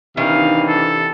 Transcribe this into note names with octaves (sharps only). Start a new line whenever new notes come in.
C3 D#3 E3 D4 D#4 A#4 F5
A4